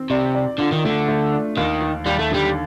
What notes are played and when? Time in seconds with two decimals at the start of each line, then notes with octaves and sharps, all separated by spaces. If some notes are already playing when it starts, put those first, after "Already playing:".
Already playing: D#3 C4
0.10 C3 D5
0.35 D5
0.59 D3 F4
0.73 D#3
0.84 D3 A3
1.08 A3
1.32 D4
1.57 D#2 D#3
1.82 D#2
2.06 D#2 G3
2.19 A3
2.31 D3 G3